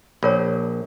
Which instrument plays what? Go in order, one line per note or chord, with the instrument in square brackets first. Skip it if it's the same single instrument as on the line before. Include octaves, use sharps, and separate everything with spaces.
[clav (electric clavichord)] A#1 [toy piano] F4 A#4 C#5